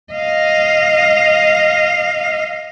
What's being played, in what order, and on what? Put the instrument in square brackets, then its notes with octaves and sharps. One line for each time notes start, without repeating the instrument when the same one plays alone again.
[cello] D#5 F5